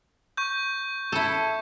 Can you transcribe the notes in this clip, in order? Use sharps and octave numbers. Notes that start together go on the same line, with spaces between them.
C#6 G6
E4 A4